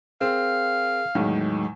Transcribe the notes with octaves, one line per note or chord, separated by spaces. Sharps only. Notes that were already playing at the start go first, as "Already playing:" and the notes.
C4 G#4 A#4 F5
E2 A2 D#3 F#3 G#3